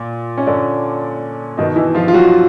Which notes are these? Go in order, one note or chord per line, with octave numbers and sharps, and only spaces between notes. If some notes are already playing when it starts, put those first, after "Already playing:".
Already playing: A#2
C#4
D3 D4
B2 D#3 D#4
E3 E4
F3 F4
F4
F#3 F#4